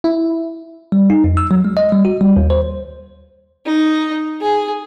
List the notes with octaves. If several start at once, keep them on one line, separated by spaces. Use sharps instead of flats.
E4
G3
D#4
F2
E6
F#3
G#3
D#5
G3
F#4
G3
D#2
C5
D#4
G#4